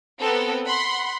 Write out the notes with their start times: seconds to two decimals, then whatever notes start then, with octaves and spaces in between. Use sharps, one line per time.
0.20 B3 C4 A4 A#4
0.65 F#5 B5 C6